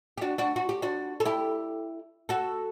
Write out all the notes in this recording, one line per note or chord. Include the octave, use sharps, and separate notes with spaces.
G4
D4 F#4
D4 F#4
F#4
G4
D4 F#4
A4
E4 G4
F#4 A4